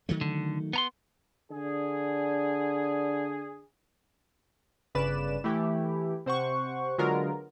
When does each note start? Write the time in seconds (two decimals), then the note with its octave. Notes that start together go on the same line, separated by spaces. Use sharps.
0.09 D#3 F#3 A3
0.21 D3
0.73 B3 A#5 C6
1.51 D3 D4 G#4
4.95 G1 C#3 B4 D5 E7
5.44 E3 A3 E4 G4
6.26 C3 C5 F#5 C#6
6.98 D3 F#3 G#3 B3 F4 A#4